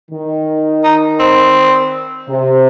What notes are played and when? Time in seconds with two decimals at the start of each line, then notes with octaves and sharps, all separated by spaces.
0.11 D#3
0.84 D#4
1.20 C4
2.29 C3